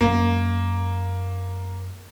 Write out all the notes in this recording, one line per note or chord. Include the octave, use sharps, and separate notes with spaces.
F#2 G#3 A#3